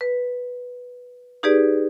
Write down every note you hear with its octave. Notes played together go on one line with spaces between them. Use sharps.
B4
D#4 G4 G#4 B4 D5